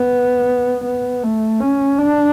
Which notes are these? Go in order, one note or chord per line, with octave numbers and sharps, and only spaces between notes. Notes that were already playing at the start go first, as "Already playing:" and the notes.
Already playing: B3
B3
A3
C#4
D4